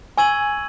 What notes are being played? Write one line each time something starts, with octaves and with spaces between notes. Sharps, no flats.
G#5 C#6 E6 G#6 D#7 F#7